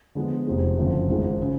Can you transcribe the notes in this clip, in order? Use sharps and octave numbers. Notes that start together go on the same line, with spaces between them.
D3 F3 G#3 B3
F1 F2 F3 G#3
F#1 F2 D3 F3 A3
G#1 G#2 F3 G#3
C#3